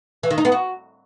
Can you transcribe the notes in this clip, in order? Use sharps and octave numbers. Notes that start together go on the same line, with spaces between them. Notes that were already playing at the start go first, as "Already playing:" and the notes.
E3
D#3
D#4
B3
F#4